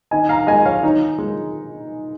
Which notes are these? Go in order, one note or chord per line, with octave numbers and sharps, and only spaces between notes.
D#3 D#5 G#5
F5 A#5
G#3 D#5 G#5
C#5 F5
D#3 D#4
G#3